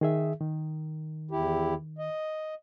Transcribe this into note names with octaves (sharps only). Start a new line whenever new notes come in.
D#3 G#4 E5
D#3
E2 E4 G4
D#5